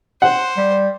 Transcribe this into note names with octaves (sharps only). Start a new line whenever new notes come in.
C5 F#5
G3